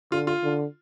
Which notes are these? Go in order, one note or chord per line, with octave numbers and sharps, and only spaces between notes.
D3 F4
F4
D3